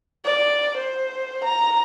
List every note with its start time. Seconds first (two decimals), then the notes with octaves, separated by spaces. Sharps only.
0.25 D5
0.77 C5
1.44 A#5